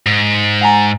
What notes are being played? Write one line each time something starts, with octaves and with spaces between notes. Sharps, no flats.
G#2
F#5 G#5 A#5